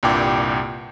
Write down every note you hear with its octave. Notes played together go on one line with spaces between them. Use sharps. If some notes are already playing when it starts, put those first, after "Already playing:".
C2 G2 A#2 G5 D6